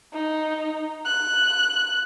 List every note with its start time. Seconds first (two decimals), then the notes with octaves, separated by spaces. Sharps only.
0.13 D#4
1.05 F#6